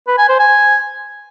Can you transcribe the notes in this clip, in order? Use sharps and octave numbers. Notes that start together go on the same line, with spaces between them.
B4
G#5
C5
G#5